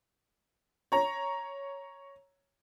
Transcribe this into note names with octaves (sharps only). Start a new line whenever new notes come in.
C#5 A#5